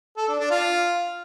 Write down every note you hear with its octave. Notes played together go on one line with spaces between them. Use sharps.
A4
D4
D4
F4